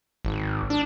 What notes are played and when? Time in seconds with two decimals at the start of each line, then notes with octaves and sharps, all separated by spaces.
0.25 G#1
0.70 D4